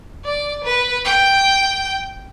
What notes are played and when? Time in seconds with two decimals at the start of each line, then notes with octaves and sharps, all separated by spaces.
0.25 D5
0.64 B4
1.05 G5